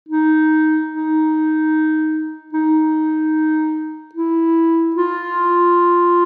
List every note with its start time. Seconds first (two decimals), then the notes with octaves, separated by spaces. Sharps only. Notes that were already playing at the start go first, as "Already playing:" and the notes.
0.09 D#4
0.91 D#4
2.53 D#4
4.15 E4
4.96 F4